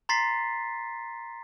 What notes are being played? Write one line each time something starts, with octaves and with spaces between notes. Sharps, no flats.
A#5 C6 A6 B6 C7